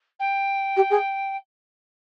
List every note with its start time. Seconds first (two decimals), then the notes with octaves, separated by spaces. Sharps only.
0.19 G5
0.77 G4
0.90 G#4